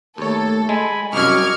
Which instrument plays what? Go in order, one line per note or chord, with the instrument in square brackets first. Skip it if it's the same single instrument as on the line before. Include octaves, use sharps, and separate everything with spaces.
[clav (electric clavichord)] D#2 C#5 [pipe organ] A3 [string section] A4
[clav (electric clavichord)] G#3 [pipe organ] G#5 B5
[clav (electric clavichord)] C2 F#2 [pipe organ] D#5 D6 [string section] C#6 F6 G#6